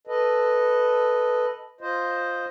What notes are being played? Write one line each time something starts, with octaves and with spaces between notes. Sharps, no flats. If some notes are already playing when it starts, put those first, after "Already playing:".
A4 B4 D#5
F4 C5 D#5